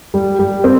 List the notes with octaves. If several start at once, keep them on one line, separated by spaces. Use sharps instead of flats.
G3
G3
C4